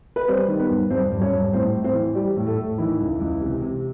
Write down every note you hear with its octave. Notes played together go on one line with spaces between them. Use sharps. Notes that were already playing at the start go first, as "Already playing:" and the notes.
B4
G3 C4 C5
D#3
B3 B4
G2
G2 C4 C5
G2
C#4 C#5
G2
A2 C4 C5
A2
C4 C5
E3
G3 G4
A2
A3 A4
A2
D#3 E3 E4
C#2
C#2
C3
C3